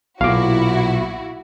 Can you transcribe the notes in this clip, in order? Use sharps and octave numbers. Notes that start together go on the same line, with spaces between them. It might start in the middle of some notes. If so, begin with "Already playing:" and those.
B1 A#2 E4 F#4 F5 D6